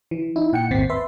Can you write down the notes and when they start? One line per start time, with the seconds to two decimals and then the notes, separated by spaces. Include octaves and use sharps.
0.11 E3
0.36 D#4 E4
0.53 A#2 F#5 G5 C#7
0.71 G#1 D#2 C4 A6 B6 C7
0.89 B4 E5 C6